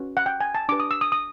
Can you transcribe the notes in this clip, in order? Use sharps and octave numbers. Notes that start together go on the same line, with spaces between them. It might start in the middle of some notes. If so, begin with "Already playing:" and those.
Already playing: C#4 F#4 B4
F#5
G5
G#5
A5
D4 G4 B4 D6
D#6
E6
D#6
D#6